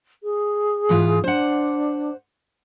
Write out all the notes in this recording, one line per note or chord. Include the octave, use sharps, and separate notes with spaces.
G#4
G#2 E3 F4
D4 C5 F#5